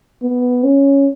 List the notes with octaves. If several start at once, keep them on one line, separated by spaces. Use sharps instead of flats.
B3
C#4